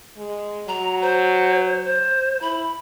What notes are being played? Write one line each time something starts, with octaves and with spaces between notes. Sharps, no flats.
G#3
F#3 A#5
C5
C5
E4 B5